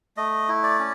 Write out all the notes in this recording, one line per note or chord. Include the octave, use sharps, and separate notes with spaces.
A3 D#5
E4
D5
C#4